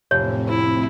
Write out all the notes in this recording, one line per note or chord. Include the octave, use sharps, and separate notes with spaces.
F1 A2 C4 C#5
E4